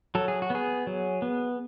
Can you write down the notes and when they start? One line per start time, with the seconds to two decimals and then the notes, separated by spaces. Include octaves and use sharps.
0.15 F#3 A4
0.28 G#4
0.42 F#4
0.50 B3 G#4
0.87 F#3
1.22 B3